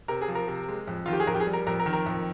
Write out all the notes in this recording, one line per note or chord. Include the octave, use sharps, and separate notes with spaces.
C3 A#4
G#4
F3
A#4
C3
G#3
F2
D#3 F4
G4
G#4
F2 A#4
G4
G#4
G3
A#4
F2 A#4
A#4
D#3
A#4
F2